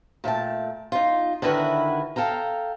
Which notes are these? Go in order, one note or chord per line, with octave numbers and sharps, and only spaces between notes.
A#2 A3 G5 A5
D#4 F4
D3 D#3 E4 F#4 A#4 B4
A4 F5 G5 A#5